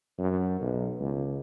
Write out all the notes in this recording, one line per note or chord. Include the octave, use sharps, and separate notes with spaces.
F#2
B1
C#2